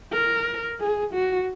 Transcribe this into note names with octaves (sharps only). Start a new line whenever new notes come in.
A#4
G#4
F#4